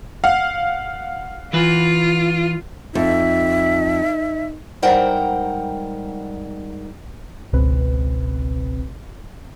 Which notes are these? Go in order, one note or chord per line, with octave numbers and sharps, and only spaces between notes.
F5 F#5
E3 F4 B4
F2 D#4 E5
G#2 G3 A#4 C5 F#5 G5
G#1 C#2 B2 C4 B4